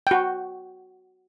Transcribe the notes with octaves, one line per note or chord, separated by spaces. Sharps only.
F#4 G5